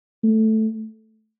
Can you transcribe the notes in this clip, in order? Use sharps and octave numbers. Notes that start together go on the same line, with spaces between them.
A3